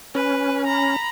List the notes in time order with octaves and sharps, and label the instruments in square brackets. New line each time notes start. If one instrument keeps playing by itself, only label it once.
[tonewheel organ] C#4 [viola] B4
[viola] A#5 B5